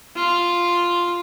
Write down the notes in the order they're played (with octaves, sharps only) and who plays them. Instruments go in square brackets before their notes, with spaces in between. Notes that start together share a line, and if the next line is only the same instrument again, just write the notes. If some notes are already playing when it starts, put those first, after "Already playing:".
[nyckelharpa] F4